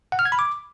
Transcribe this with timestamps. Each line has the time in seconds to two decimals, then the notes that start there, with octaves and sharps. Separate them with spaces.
0.12 F#5
0.19 F6
0.25 G#6
0.32 B5
0.39 D6